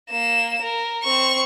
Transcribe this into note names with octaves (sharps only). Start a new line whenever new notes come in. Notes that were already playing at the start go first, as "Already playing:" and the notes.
A#3 E7
A#4
C4 C#6